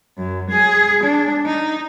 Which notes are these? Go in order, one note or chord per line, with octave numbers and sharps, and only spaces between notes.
F#2
G#4
D4
D#4